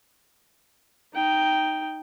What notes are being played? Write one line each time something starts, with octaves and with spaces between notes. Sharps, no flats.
D#4 G5